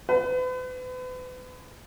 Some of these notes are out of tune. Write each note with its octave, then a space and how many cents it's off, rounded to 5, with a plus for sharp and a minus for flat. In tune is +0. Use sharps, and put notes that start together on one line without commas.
B4 +40